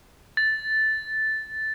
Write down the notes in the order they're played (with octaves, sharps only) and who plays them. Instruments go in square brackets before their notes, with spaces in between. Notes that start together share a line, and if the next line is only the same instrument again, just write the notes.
[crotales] A6